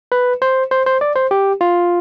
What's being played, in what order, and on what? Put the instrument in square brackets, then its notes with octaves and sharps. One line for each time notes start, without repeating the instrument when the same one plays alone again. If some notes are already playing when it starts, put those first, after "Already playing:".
[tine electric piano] B4
C5
C5
C5
D5
C5
G4
F4